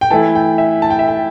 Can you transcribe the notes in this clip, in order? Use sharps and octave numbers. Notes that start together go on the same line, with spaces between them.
G5
E3 A3 E4 A5
G5
E5
A5
G5
E5
G5